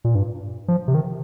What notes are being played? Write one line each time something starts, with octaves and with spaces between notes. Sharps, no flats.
A#2
G2
F3
C3
D#3